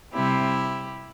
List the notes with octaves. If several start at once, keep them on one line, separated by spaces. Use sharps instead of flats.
C3 G3 C4 E4 G4